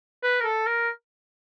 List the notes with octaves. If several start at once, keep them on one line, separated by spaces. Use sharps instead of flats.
B4
A#4
A4
A#4